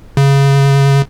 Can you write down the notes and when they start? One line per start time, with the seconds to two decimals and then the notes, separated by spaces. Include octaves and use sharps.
0.17 C#3